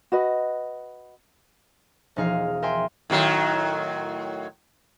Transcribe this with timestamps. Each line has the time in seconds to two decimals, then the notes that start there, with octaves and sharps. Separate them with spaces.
0.12 F#4 B4 D#5
2.16 E1 F3 D#4 G#4 F5
2.62 A#4 E5 G5 G#5 C6
3.10 A2 D#3 F#3